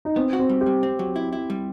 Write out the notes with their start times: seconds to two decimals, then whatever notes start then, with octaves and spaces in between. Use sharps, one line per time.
0.05 D#4
0.16 B3 C4
0.33 F#4
0.39 C4
0.49 G3
0.61 G4
0.66 G3
0.83 C4
0.99 F#3
1.16 E4
1.33 E4
1.50 G3